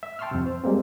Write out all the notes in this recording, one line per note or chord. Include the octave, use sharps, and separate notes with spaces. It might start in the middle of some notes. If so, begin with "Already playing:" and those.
E5
G5 A5 C6 C#6 E6 F6
F2 C3
C5
G3 G#3 A#3 C4